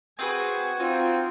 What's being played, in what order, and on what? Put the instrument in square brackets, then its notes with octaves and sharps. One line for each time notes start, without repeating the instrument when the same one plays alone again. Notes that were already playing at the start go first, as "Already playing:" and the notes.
[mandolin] C4 G#4 B4 [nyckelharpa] F#4 G#5
[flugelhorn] C4 [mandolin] D#4 [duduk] F4